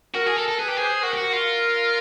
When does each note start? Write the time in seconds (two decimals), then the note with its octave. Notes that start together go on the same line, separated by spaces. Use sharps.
0.14 F#4 A#4
0.26 G#4
0.37 A4 A#4
0.48 A4
0.59 G#4 B4
0.68 G4
0.77 G#4 C5
1.02 F#4 A#4
1.14 G4
1.17 F#4
1.33 F4